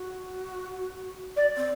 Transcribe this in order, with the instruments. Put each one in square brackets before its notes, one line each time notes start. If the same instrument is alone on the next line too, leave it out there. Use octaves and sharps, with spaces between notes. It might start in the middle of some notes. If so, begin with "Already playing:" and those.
Already playing: [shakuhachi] F#4
[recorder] D5
[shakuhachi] C4